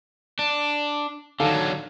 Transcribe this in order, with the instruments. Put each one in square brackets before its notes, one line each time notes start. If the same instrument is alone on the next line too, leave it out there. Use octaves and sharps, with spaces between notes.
[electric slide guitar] D4
[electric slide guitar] D3 F#3 [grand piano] D#3 A4 F5